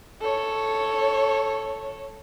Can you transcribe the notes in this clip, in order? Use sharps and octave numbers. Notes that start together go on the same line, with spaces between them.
A4 C#5